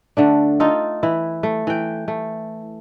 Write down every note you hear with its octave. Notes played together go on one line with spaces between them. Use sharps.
D3 A3 D4
D#4 F4 A4
E3 E4
A3
E3 G5
A3